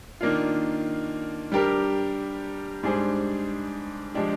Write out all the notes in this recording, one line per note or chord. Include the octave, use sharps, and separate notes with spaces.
D#3 A#3 D4 F4
G3 D4 G4 A#4
G#2 G3 D4 G#4 C5
F3 G#3 D4 G4